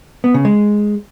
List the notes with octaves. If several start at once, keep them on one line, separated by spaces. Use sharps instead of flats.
B3
C#3
G#3